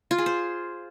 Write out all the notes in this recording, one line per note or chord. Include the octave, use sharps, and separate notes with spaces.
F4
G#4
C5